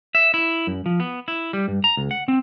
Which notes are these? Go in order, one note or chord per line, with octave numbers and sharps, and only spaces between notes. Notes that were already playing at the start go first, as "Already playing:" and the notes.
E5
E4
F#2
F3
B3
E4
G3
G2
A#5
C#2
F#5
C4